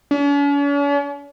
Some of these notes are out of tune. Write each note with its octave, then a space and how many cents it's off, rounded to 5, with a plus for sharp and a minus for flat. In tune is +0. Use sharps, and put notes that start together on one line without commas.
C#4 +45